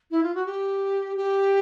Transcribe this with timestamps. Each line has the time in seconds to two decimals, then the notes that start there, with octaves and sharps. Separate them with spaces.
0.11 E4
0.23 F4
0.35 F#4
0.46 G4
1.17 G4